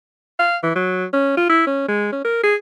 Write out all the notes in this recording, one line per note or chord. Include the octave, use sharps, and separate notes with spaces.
F5
E3
F#3
C#4
F4
E4
C#4
G#3
C#4
A#4
G#4